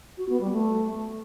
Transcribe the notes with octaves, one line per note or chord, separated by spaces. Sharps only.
F#4
B3
G3
A3